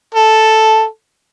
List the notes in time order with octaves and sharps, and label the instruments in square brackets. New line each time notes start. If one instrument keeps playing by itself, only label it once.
[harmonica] A4